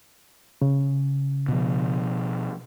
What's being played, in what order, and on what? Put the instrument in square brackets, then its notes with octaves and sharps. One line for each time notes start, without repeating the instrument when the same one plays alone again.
[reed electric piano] C#3
[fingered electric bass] B2 F3